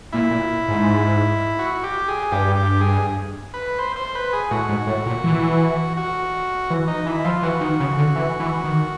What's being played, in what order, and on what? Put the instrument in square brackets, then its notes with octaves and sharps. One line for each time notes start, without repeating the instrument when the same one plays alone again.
[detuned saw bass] A#2 [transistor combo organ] E4
[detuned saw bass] A#2
G#2
[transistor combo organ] F#4
G4
G#4
[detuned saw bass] G2 [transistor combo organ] G4
[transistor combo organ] G4
G#4
B4
C5
C5
B4
G#4
[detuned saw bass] A2 [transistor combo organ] F#4
[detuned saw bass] G#2
A2
A#2
E3
[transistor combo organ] F#4
[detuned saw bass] E3
[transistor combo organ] D#4
[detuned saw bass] E3 [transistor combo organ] E4
[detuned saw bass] F3 [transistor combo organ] F4
[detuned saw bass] E3 [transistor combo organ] F#4
[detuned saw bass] D#3
C#3
D3
E3
E3
D#3